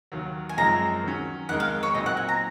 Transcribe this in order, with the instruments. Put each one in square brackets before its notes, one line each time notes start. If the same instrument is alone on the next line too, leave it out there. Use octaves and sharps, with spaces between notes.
[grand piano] D#2 D#3 F#3
[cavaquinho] G#5
[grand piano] F#2 F3 G#3 C4 D#4 [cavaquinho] A#5
[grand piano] D#3 F#3 C#4
[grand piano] F2 D#3 G#3 D#4 A#4 [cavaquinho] F#5
[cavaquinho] F5
C#5
[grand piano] A#2 F#3 C4 D#4 [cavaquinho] D#5
[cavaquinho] F#5
G#5
A#5